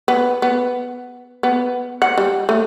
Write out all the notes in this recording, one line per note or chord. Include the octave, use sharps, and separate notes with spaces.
B3
B3
B3
F#5
G3
A3